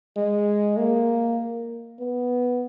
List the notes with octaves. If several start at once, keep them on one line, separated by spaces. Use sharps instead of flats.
G#3
A#3
B3